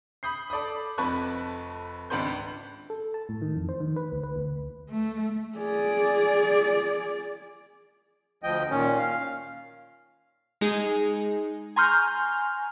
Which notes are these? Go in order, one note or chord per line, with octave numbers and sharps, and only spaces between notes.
B5 D#6 G6 C7
A4 D5 B5 D#6
F1 F2 B4 A5 C#6 F#6
G#1 C#2 D4 B4 C6 G6
A4
A5
A2
D#3
F2
C5
D#3
B4
D2
B4
D2
A3
G#4 D5
D2 F3 D#5 G5
A#2 D#3 C#4
F5
G#3 D#4 G#4
G#5 A#5 C6 C#6 F6 G6